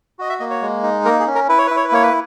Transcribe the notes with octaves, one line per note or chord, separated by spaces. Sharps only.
F#4 D#5
E5
A#3 D#5
C#5
G#3
D#4
A#3 A#4
G#4
C#4
A#4
E4 B4
C#5
E4 B4
C#5
B4
A#3 C#5
B4